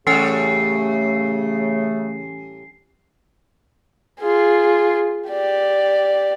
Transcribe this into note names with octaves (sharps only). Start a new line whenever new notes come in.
A2 C#3 E3 G3 A3 C#4 G#5 C7
F4 G#4
G4 D5